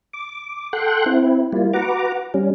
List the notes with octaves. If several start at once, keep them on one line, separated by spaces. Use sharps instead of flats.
D6
A4 F#5 G5 C6 F#6
C4 E4
G3 A#3 E4 F4
F#4 B4 F#5 A#5 D6
G3 C#4